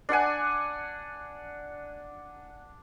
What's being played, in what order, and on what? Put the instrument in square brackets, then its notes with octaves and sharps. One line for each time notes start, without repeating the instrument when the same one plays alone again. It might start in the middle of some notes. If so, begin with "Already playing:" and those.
[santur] D4 D5 F#5 G#5